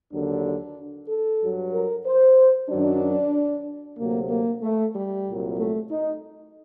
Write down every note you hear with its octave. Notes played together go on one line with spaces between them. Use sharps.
D#2 D3 F#3 D4
A4
G2 F#3
A#4
C5
F#2 D#3 F#3 D4
D2 C3 F#3 A#3
A#3
A3
G3
C2 A#2 F#3
A3
D#4